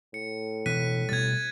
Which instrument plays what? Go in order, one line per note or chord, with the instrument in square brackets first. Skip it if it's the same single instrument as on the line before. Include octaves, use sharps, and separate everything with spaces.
[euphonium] A2 [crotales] C#7
[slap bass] B2 E3 A3 [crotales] F#6 B6 D#7
[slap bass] B2 G3 [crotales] G#6 A6